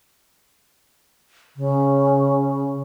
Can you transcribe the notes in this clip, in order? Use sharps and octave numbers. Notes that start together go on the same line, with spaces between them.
C#3